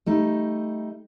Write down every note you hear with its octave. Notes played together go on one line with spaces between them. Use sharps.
G3 A3 D#4